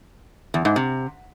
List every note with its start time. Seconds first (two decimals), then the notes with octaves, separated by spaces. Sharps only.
0.54 E2
0.65 G#2
0.76 C3